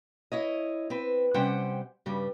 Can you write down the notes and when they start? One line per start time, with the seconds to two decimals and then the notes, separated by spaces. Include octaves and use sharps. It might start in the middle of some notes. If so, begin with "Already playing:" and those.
0.32 E4 C#5 D#5
0.90 C4 B4
1.34 C3 G3 C#4 C5 F#5 G5
2.06 G2 C#3 G3